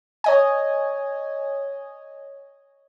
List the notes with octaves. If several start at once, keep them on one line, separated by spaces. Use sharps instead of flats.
C#5 D#5 G#5